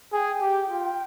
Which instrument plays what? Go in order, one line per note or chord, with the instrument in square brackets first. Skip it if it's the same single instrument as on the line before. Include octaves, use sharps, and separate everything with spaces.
[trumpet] G#4 [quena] G#5
[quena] G5
[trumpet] G4
F4